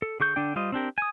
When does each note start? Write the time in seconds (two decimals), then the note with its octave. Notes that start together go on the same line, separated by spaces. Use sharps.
0.02 A4
0.20 D3 G#4 C#6 G6
0.36 D3 D4 D5 G5
0.56 G3 F4 C5 D#5
0.72 C4 D4 G4 A#4
0.98 G#5 D#6